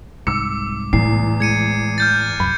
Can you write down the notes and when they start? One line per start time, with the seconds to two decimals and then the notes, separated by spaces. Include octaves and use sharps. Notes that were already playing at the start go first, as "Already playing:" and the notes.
0.27 C2 G#2 D6 E6 C#7
0.93 E2 A2 C7
1.40 G#3 G#6 C#7 D#7
1.98 F6 G6 A6
2.40 C2 F#2 B5